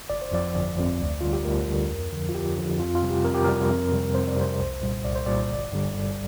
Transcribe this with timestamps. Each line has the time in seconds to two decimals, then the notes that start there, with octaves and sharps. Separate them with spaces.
0.10 G1 D5
0.22 C5
0.32 F2 F3 D5
0.55 G1
0.77 F2 F3
0.99 D2
1.21 D3 G3 F4
1.33 G4
1.45 D2 A#4
1.68 D3 G3
1.90 F2
2.12 D3 F3
2.29 F4
2.34 F2 G4
2.57 D3 F3
2.79 F2 F4
2.95 F4
3.02 C3 G3
3.10 G4
3.25 F2 A#4
3.34 G4
3.44 C3 G3 A#4
3.70 F2
3.92 C3 G3
4.15 F2 C5
4.28 D5
4.37 C3 G3 C5
4.59 C2
4.82 A#2 G3
5.04 C2 D5
5.15 C5
5.26 A#2 G3 D5
5.49 G1
5.72 G2 D3 G3
5.94 G1